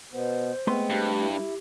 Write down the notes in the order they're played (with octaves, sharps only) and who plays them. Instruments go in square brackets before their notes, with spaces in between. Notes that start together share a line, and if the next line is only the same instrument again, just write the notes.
[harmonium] B2 B3 [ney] C5
[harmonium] G#3 C4 [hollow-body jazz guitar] A3 B3 C6
[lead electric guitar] G2 [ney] G4
[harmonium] E4